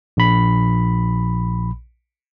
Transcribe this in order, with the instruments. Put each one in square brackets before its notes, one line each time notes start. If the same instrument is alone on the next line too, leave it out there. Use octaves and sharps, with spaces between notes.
[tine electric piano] A#1 B5